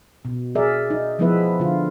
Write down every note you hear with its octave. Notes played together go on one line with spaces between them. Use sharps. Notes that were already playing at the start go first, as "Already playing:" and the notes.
B2
G#4 A#4 D5 E5
D#4
F3 G#3 B3 E4 B4 E5
D3 F4